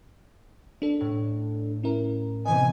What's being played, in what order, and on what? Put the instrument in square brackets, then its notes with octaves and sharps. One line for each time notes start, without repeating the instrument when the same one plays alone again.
[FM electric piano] D4 A4
[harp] A2
[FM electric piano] C#4 E4 A#4
[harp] C3 E3 B3 [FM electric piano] D#5 [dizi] G#5